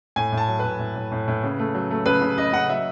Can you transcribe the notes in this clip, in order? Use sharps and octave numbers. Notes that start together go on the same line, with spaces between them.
A2 G#5
A2
A5
F#3
A2 B4
A2
A2
A2
A2
C#3
A3
F#3
A3
C#3 B4
C#3
C#3 D#5
C#3 F#5
F#3 E5